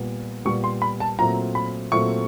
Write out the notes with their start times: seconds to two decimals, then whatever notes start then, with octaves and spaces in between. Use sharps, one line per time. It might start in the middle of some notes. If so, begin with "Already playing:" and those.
Already playing: A#2 G3 B3
0.45 A#2 G3 B3 C#6
0.64 C6
0.82 B5
1.00 A5
1.19 A#2 F#3 A3 C4 E4 A#5
1.55 B5
1.92 A#2 F#3 A3 C4 E4 C#6